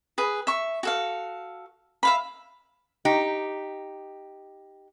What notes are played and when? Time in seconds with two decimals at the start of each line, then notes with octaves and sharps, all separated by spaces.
0.18 G#4 B4
0.47 E5 C#6
0.83 F#4 A4 F5
2.03 E5 F5 B5
3.05 D#4 G4